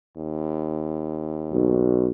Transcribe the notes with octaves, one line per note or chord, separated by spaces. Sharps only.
D#2
B1